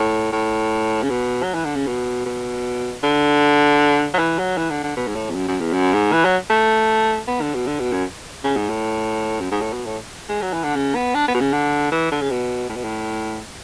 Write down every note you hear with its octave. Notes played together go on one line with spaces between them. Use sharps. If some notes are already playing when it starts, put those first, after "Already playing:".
Already playing: A2
A2
C#3
B2
F#3
E3
D3
C#3
B2
B2
D3
F#3
E3
F#3
E3
D3
D3
B2
G#2
A2
E2
F#2
F#2
E2
F#2
G#2
E3
F#3
A3
B3
D3
B2
D3
B2
F#2
C#3
G#2
A2
F#2
G#2
A2
B2
A2
G#3
F#3
E3
D3
C#3
B3
D4
B3
B2
C#3
D3
E3
D3
C#3
B2
A2
B2
A2